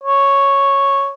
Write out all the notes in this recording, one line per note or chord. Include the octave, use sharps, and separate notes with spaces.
C#5